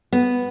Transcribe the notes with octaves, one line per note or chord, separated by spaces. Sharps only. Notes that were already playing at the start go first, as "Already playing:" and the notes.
B3